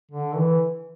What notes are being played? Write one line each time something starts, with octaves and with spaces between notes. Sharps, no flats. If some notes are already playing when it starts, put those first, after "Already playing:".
D3
E3